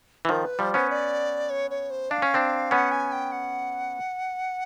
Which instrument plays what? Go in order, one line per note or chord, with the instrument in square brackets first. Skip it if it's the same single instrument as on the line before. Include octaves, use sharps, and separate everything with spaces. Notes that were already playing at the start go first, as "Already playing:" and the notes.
[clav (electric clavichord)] E3
[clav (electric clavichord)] D#3 F3 [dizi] A#4
[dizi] B4
[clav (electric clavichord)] F3 G3 [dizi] C5
[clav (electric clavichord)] B3 C#4 [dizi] C5
[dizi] D5
C#5
C#5
C5
[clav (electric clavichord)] D4 [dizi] F5
[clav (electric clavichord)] C#4
C4 D4
[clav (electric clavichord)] B3 C#4 [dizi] F#5
[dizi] G#5
G5
F#5